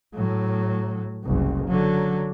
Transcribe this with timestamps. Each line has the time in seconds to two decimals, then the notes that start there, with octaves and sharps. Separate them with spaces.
0.14 A2 F#3
1.25 F#1 C2
1.68 D3 F#3